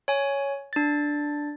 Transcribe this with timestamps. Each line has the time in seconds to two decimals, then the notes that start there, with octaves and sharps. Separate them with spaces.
0.08 C#5 G#5
0.73 D4 A6